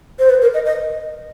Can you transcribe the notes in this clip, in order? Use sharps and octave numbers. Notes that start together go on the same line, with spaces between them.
C5
B4
A#4
D#5
D#5